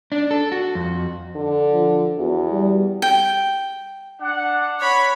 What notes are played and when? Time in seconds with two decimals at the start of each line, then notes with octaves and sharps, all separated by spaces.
0.12 D4
0.31 A4
0.52 F#4
0.75 F2
1.36 D3
1.72 F3
2.19 E2 F#4
2.51 G3
3.02 G5
4.21 D4 F#5
4.79 C#5 B5